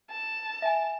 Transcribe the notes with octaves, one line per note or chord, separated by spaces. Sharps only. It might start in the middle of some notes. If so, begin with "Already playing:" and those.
A5
E5 G#5